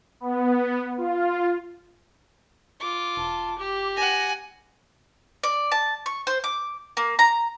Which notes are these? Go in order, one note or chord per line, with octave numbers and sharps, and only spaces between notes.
B3
F4
F4 D6
E1 A5
G4 D6
F#5 G#5 A#6
D5
A5
C#6
C5
D6
A#3
A#5